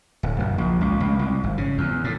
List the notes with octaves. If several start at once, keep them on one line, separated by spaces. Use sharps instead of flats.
D1
F#1
A#1
C#2
C#2
C2
G#1
C#3
E2
A2